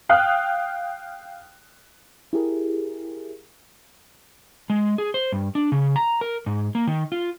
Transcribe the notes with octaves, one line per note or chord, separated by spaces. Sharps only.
F5 G5 D#6 F6 F#6
E4 G4 G#4 A#4
G#3
G#4
C5
G2
D4
C#3
A#5
A#4
G#2
A#3
D#3
F4